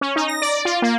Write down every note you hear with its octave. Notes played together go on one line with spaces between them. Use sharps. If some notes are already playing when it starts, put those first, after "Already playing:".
C#4
D#4
A#6
D5
F4
A#3